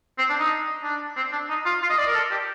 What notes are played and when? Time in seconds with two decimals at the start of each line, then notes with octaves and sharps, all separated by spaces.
0.18 C4
0.29 D4
0.39 D#4
0.83 D4
1.16 C4
1.32 D4
1.49 D#4
1.65 F4
1.82 F4
1.90 D#5
1.98 D5
2.07 A#4
2.15 A4
2.31 G4